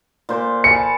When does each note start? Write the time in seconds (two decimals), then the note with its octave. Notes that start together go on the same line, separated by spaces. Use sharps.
0.29 A#2 C5 D6
0.64 G#5 A5 B5 C#7